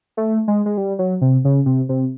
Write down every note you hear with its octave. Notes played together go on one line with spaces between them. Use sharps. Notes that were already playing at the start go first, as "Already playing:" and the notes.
A3
G#3
G#3
G3
F#3
C3
C#3
C3
C3